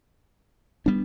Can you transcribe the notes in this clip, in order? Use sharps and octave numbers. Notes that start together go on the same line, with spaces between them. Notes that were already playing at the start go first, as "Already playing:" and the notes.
G3 B3 D4